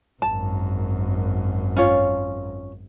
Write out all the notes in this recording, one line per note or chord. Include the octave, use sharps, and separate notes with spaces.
G#1 F#2 A5
C#4 F4 C#5